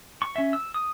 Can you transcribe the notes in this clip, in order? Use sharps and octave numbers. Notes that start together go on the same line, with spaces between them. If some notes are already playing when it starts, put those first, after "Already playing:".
C#6
C#4 E5
E6
D#6